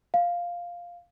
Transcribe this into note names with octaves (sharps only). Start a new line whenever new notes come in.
F5